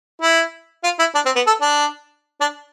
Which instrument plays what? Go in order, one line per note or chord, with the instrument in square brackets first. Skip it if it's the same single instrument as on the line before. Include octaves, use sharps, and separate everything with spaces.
[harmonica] E4
F4
E4
D4
C4
B3
A4
D4
D4